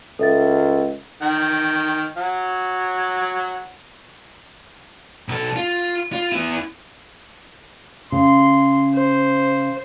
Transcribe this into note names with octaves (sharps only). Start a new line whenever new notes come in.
C#2 A4 E5 A6
D#3 G5
F#3 F#5
B1 A4
F4
F4
B3 E4
C#3 C6
C5